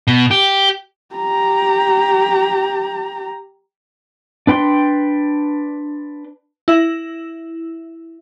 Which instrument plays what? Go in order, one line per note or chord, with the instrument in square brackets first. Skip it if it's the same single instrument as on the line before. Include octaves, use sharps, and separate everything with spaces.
[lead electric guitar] B2
G4
[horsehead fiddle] G4 A#5
[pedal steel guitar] D4 B4 G5 C6
[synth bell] E4 E5